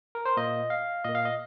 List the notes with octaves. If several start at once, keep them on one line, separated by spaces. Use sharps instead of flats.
A#4
C5
A#2 A#3 D#5
F5
A#2 A#3 D#5
F5
D#5